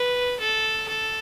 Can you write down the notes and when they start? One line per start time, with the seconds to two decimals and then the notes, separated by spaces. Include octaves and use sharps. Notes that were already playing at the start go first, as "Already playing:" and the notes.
Already playing: B4
0.40 A4
0.88 A4